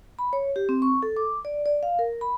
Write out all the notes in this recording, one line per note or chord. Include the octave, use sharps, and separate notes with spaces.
B5
C#5
G4
C4
C#6
A4
D6
D5
D5
F5
A#4
B5